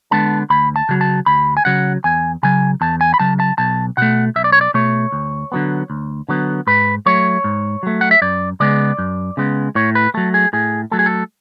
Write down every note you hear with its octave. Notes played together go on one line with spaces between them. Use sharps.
D3 G#3 B3 A5
D2 B5
A5
C#3 F#3
A5
D2 B5
G#5
C#3 F#3 F#5
E2 G#5
C#3 F#3 G#5
E2 A5
G#5
B5
C#3 F#3 A5
A5
B1 A5
B2 A3 F#5
B1 E5
D5
C#5
D5
B2 A3 C#5
D2
D3 F#3 B3
D2
D3 F#3 B3
G#2 B4
F#3 A3 C#5
G#2
F#3 A3
F#5
E5
F#2 D5
C#3 G#3 B3 D5
F#2
C#3 G#3 B3
A2 C#5
B4
F#3 A3 A4
G#4
A2 G#4
F#3 A3 A4
G#4
A4